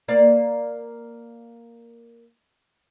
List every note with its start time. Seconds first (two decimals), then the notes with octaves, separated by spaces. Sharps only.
0.08 A#3 D5